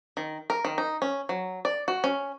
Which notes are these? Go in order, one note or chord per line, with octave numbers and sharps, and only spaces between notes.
D#3
A#4
D#3
D#4
C#4
F#3
D5
F#4
C#4